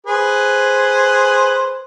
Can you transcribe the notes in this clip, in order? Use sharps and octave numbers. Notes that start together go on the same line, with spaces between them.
G#4 B4 C5